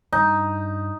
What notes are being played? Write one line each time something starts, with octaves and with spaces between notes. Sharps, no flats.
G2 D#4